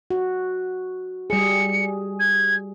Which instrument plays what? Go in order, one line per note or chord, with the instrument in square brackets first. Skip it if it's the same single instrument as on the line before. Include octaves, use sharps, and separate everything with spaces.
[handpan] F#4
[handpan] G3 G#4 [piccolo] C#7
[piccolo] G#6